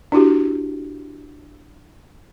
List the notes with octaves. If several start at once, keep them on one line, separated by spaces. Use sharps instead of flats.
D4 E4 F#4 G4